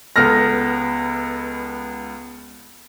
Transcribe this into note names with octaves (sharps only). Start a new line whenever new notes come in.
C#2 B3 A4 F6 A#6